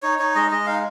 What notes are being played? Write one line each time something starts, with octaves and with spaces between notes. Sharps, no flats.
D#4 C#5
D#4 C#5
G#3 D#5
G#3 D#5
D#4 F5